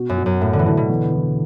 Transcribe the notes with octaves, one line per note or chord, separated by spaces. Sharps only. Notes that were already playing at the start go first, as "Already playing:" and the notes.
Already playing: B2 F#4
F#2
F#3
F#2
A2 A3
D3
E3
D3 E4
B2
E2
E3